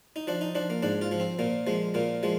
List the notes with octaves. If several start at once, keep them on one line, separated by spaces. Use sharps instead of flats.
D#4
F3 D4
D#4
F3 D4
A#3
G#2 D4
F4
F3
C4
A#2 A#3
F3 G#3
A#2 A#3
F3 G#3